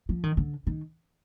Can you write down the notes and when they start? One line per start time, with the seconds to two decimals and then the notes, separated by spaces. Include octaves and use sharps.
0.09 F3
0.23 D#3
0.37 D3
0.67 D#3